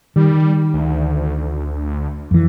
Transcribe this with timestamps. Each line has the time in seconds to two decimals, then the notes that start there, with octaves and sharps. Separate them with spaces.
0.16 D#3 G3
0.74 D2
2.31 F2 E3